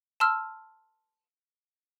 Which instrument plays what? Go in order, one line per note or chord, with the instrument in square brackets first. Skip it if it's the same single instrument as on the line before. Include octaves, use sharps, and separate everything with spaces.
[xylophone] A5 C6 E6 F6